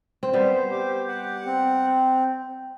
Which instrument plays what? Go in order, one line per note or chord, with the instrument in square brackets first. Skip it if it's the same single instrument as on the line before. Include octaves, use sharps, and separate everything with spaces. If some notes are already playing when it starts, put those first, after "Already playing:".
[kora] C4
[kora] G3 B3 [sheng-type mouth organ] C5
[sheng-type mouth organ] G4
F#5
C4